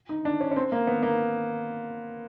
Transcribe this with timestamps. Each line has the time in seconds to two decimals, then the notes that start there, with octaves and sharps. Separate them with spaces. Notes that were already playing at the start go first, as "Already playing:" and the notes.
0.09 D#4
0.25 D4
0.41 C#4
0.51 C#4
0.56 C4
0.72 A#3
0.87 B3
1.03 A#3